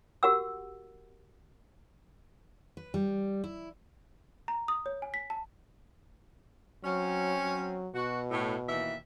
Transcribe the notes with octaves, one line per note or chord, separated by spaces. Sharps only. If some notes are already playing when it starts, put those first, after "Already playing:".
F#4 G4 A#4 F#5 E6
B4
G3
E4
A#5
D#6
C#5
G#5
B6
A5
F#3 C4 C#4
F#3
B2 F#4
A2
D#2 E3 E5